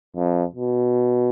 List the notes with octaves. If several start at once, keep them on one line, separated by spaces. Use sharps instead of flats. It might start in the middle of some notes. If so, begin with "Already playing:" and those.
F2
B2